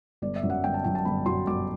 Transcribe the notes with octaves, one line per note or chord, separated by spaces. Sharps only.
G1 D5
E5
F#2 F#3
F#5
G1 G5
A5
F#2 F#3 G5
A5
G1 B5
F#2 F#3 C6
G1 D6